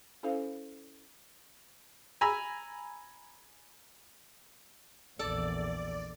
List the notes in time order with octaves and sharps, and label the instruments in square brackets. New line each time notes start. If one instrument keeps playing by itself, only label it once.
[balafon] C#4 E4 A4 C5 F5
[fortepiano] G#5 A#5 B5 E6
[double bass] A#1 E2 [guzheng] A4 [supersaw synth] D5